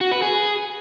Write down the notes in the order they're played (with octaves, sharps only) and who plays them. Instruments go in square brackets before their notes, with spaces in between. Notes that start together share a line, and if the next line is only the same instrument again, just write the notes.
[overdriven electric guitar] F#4
B4
G#4